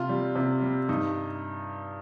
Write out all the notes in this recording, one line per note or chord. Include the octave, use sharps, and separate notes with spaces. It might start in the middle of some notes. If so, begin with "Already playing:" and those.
Already playing: C3 F4
G3
C3
G3
G2 D#4